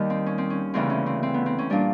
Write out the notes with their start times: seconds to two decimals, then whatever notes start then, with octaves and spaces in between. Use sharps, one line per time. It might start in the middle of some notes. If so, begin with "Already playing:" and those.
Already playing: D#2 D#3 G3
0.10 C4
0.26 C#4
0.38 C4
0.50 C#4
0.74 D2 C#3 E3 C4
0.90 C#4
1.06 C4
1.23 C4
1.34 B3
1.46 C4
1.59 C#4
1.70 A#2 G3 D4